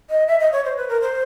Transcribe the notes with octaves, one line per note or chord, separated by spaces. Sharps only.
D#5
E5
D#5
C#5
C5
B4
A#4
C5